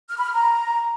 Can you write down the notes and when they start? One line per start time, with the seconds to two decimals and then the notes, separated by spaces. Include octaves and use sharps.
0.09 F6
0.17 B5
0.25 F6
0.33 A#5